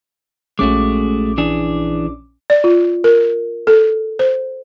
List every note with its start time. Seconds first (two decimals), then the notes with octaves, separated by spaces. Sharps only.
0.59 A#1 G#3 A3 C#4 F#4 D6
1.38 E3 D4 G#4
2.50 D5
2.64 F4
3.04 A#4
3.67 A4
4.19 C5